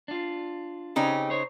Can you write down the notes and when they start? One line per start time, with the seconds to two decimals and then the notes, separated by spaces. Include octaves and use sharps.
0.08 D4 F4
0.96 C#3 C4 C#4 D#4 G4
1.30 C5 C#5